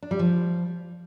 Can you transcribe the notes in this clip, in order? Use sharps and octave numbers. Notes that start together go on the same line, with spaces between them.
D4
G3
F3